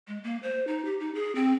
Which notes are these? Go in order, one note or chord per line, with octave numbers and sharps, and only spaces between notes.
G#3
A#3
C5
D#4
G4
D#4
G#4
C4